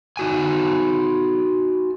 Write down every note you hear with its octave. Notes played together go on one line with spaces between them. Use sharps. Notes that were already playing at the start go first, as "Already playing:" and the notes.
D#4 F#4 G#5